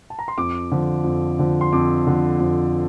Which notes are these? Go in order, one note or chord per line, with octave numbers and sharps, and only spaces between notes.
A5
A#5
C6
F2 D6
D3 F3
F2
D3 F3
C6
F2 D6
D3 F3
F2